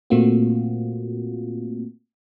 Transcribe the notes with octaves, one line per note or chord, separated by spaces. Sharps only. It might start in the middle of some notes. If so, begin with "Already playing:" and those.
A#2 A3 A#3 C4 F4 F#4